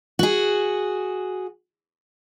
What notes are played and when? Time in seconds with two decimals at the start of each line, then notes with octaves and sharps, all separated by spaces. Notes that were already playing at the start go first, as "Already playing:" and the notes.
0.19 F#4 G#4